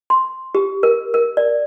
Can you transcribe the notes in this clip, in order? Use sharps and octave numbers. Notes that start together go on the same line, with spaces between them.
C6
G4
A#4
A#4
D5